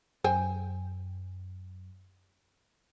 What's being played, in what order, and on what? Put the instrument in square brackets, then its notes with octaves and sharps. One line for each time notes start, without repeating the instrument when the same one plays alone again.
[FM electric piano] F#2 [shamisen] C5 G5 G#5